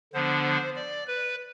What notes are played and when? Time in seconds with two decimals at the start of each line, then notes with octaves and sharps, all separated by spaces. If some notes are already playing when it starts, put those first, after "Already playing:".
0.13 D3 F3 B3 D4 C5
0.75 D5
1.07 B4